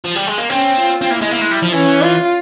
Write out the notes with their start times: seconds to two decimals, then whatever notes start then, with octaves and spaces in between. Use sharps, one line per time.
0.05 F3
0.15 G3
0.27 G#3
0.38 A#3
0.50 C4 C#4
0.81 F4
1.01 C4
1.10 A#3 E4
1.21 G#3
1.31 A#3
1.41 G#3
1.51 G3
1.62 F3
1.72 E3 C#4
2.02 F4